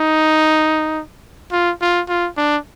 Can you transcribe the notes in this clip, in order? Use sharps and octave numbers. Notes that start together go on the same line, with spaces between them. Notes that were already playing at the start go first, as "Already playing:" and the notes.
Already playing: D#4
F4
F4
F4
D4